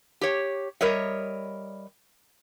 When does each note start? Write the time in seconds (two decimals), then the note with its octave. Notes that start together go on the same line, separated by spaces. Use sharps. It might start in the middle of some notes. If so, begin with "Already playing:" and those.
0.21 G4 C#5
0.81 G3 A#4 C#5 D#5 E5